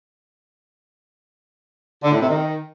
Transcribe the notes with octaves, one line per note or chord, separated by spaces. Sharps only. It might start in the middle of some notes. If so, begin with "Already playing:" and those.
D3
A2
C3
D#3